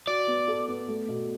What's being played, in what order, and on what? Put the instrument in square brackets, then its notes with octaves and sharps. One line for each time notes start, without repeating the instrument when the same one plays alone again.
[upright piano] F#4 [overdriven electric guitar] D5
[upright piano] B3
A4
B3
A3
B2